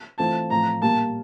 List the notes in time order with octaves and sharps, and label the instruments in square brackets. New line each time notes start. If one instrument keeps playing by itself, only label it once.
[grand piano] E3 A3 C4 F4 [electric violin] A5
[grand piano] A2 F3 C4 F4 [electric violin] A#5
[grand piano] A#2 G3 A#3 [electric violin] A5